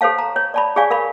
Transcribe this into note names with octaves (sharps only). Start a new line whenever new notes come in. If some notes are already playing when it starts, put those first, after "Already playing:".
G4 A4 C5 C#5 F5 A5
A#5
C#5
D5 A5 B5
G4 G#4 C#5 D5 F5 G#5
A#4 F5 B5